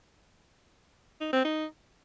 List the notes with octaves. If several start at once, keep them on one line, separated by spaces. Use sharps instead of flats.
D#4
C4
D#4